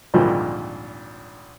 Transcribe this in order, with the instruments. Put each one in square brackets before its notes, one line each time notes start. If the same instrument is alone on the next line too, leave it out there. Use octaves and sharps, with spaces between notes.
[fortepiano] G#1 D2 A#2 F3 G3